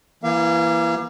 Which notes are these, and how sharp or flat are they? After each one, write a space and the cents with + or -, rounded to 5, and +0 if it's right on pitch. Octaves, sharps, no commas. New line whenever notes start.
E3 +20 A#3 +25 F5 -35